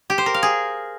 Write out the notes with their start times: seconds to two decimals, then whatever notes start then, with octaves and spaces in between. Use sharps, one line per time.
0.10 G4
0.18 C5
0.26 A#4
0.34 F5
0.43 G#4